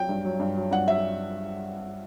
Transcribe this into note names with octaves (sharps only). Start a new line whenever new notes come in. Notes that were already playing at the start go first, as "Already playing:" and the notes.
Already playing: F#3 G5
G2
F#3
G2
F#3
G2 F#5
F#3 E5